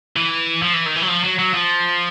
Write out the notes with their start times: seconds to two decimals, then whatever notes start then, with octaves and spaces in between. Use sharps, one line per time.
0.16 E3
0.62 F3
0.73 E3
0.86 D#3
0.96 E3
1.02 F#3
1.09 F3
1.24 F#3
1.39 F#3
1.54 F3